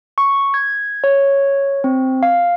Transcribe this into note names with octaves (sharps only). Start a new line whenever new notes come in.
C#6
G#6
C#5
C4
F5